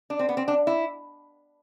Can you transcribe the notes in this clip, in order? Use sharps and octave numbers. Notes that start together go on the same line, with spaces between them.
D4
C4
B3
C4
D4
E4